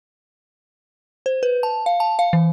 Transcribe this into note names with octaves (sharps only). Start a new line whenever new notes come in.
C5
B4
A5
F5
A5
F5
E3